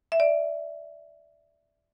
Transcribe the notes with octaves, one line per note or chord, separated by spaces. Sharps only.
E5
D5